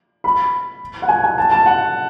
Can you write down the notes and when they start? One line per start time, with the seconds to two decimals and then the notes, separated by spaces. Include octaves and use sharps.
0.24 B5
1.02 F#5
1.09 G#5
1.24 G#5
1.38 A5
1.51 A5
1.66 F#5